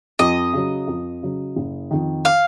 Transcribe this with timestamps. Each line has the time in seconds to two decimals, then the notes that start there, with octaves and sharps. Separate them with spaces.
0.19 F2 D#5
0.53 C#3 F#3
0.87 F2
1.23 C#3 F#3
1.56 F#1
1.91 F2 D#3
2.25 F5